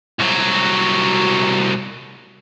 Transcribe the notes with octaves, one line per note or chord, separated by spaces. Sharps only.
C2 F#3